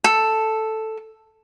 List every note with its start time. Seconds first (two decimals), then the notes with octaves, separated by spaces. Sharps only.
0.04 A4